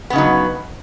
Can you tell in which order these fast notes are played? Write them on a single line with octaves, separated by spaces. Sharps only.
B3 C#3 D#4 F#3